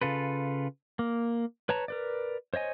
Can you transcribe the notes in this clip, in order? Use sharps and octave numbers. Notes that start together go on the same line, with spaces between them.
C#3 F4 A4 B4
A#3
B4 C#5 A5 A#5
A#4 B4 D5
C5 C#5 D#5 G#5